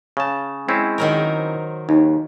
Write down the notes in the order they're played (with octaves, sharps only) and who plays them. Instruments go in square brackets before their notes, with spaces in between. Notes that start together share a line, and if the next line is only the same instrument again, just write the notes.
[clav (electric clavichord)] C#3 A5
[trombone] G#3 [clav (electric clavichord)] C4 C#4 E4
[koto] D#3 F#3 A#4
[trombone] C5
[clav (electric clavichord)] D#2 [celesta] D#4